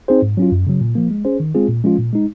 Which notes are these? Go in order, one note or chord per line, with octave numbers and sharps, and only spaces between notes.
C4 D#4 G#4 C5
G#2
F#3 C#4 F4
F#2
C#3 F#3
A#2
F3 A#3
G#3
C#4 G#4 C5
D#3
G#3 C4 F4 G#4
A#2
F3 G#3 C#4 F4
A#2
G#3 D#4